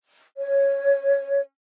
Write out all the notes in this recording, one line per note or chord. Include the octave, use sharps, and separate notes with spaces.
C#5